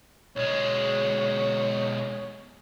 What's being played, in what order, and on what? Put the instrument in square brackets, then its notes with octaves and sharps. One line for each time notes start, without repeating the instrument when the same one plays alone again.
[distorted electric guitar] B1 G#3 [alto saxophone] C#5